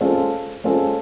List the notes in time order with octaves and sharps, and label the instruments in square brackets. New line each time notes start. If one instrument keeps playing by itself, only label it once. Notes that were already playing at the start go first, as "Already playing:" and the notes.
[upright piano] G#3 C#4 F4 A4 C5
G#3 C#4 F4 A4 C5